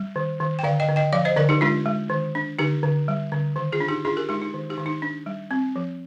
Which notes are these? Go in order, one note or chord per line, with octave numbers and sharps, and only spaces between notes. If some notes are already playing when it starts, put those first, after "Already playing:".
Already playing: G3
D#3
D#3
G5
D3 D5 F5
D#5 G5
D3
D#5 G5
F3 D5 F5
C5 D#5
D3 A#4 D5
D#4 G4
G#3 D4 F4
G#3
D#3
D4
D3 D#4 G4
D3
G3
D3
D#3
F4 G#4
D4
D#4 G4
D4 F4 G#4
G4 A#4
G#3 D#4 G4
D#4
D#3
D#4 G4
D#3
D#4
D4
G3
C4
F3